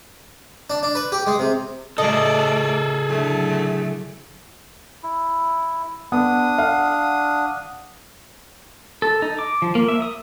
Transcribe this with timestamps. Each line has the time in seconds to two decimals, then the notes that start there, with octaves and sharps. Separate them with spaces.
0.70 D4
0.83 D4
0.95 B4
1.12 G4
1.27 G#3
1.39 C3
1.98 A2 C#3 A3 G#4 A4 D5 D#5
3.09 D3 F#3 A3 E4
5.03 E4
6.12 B3 D4 D#6
6.58 F5 F#5
9.02 A4
9.22 D#4
9.39 D6
9.62 F3
9.75 A#3
9.88 E5
10.02 D#6